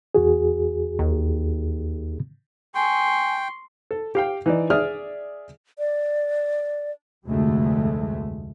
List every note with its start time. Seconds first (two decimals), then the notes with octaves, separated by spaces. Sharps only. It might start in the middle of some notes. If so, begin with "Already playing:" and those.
0.15 E2 F#4 G#4
0.99 D#2
2.75 G5 G#5 C6 C#6
3.91 A4
4.15 G4 F5 G5
4.46 E3 D#4 D5
4.70 G#4 D5 E5 D#6 F6
5.79 D5
7.28 F1 D2 G2 G#3 A3